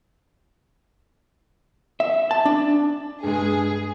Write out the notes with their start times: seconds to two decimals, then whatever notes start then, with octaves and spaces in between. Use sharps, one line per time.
2.00 E5
2.31 A5
2.45 D4
3.23 G2 G#3 G#4